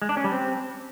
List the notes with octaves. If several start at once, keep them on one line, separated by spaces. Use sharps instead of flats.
G#3
D4
C#4
G3
C4